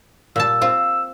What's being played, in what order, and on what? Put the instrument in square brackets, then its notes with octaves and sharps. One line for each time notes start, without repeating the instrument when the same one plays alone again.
[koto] A#2 G3 A5 [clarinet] E6
[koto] C4 F4